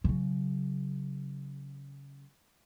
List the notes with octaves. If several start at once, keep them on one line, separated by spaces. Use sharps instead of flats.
C#3 F#3